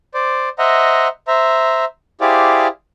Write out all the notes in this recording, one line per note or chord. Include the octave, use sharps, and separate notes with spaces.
C5 D5
C5 D#5 E5 F#5 A#5
C5 E5 A#5
E4 G4 G#4 C5 D5 F5